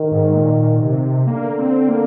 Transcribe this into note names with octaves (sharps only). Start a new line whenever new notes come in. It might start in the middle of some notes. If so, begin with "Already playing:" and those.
Already playing: D#3
G#2
A#2
C3
D3 A#3
C4
A#3